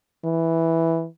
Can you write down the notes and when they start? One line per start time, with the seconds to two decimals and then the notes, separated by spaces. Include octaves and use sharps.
0.24 E3